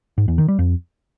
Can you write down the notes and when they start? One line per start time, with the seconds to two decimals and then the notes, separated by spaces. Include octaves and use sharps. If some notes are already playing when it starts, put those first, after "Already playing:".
0.18 G#2
0.28 E2
0.38 D#3
0.48 G3
0.59 F2